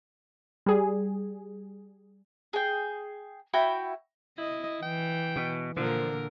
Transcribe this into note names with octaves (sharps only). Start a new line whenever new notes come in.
G3 G#4
G#4 G5
E4 F#4 G5 B5
E4 D#5
E3 G5
B2
A#2 D3 F3 A#4